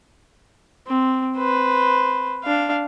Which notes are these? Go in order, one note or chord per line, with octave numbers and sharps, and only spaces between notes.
C4
B4 C5
D4 F5